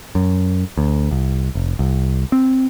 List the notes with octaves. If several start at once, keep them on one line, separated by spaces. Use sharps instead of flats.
F#2
D2
C2
F1
C2
C4